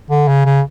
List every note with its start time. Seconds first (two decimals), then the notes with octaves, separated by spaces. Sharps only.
0.10 D3
0.28 C#3
0.45 C#3